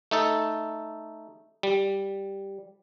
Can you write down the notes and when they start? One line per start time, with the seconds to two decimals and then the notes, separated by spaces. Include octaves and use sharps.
0.11 A3 D#4 A4
1.63 G3